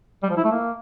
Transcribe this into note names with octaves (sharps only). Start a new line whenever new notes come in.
G3
F3
E4
A3
A#3